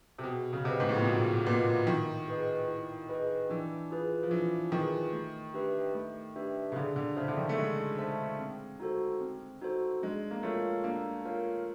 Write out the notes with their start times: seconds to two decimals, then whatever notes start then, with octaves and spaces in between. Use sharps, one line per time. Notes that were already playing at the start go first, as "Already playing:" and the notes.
0.19 C3
0.23 B2 G#4
0.53 C#3
0.64 C3 B4 D#5 F#5
0.80 G#2
0.89 A2
0.97 A#2
1.05 B2 G#4
1.46 A#2 B4 D#5 F#5
1.87 D#3 E4
2.28 G#4 B4 D#5
2.68 E4
3.09 G#4 B4 D#5
3.50 E3 D4
3.91 F4 G#4 B4
4.23 F3
4.31 E3 D4
4.72 D#3 F4 G#4 B4
5.13 A3
5.54 D4 G4 B4 E5
5.95 A3
6.36 D4 G4 B4 E5
6.72 C#3
6.76 D3 G#4
6.96 D3
7.16 C#3 C5 E5 A5
7.28 D3
7.37 D#3
7.49 A3
7.57 G#3 G#4
7.98 C5 E5 A5
8.39 C4
8.80 D#4 F#4 A4 C5
9.21 C4
9.62 D#4 F#4 A4 C5
10.02 G#3 D4
10.31 A#3
10.43 A3 F4 A#4 C#5 F5
10.84 A#3 D4
11.25 F4 A#4 C#5 F5